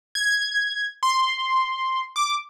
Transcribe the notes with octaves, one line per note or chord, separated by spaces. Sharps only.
G#6
C6
D6